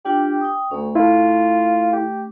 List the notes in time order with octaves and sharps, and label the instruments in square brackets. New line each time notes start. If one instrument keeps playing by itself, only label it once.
[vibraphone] D4 F4 G5 [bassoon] G4
[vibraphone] G5 D#6
[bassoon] D2 [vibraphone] A3 C#4
[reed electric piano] E4 A4 [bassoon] F4
[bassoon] G4